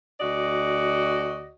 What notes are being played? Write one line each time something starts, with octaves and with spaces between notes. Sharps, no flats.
D2 F#4 D5 D#5